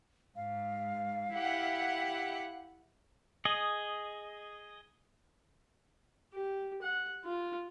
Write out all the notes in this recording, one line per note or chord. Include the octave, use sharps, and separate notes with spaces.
G#2 F5
E4 G4 F#5
G#4 D#5
G4
F#5
F4